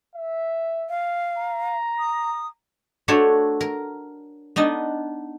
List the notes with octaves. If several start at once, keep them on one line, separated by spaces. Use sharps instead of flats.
E5
F5
A#5
D#6
A3 D4 F#4 C5 C#5 A5
A#4
B3 D4 D#4 D#5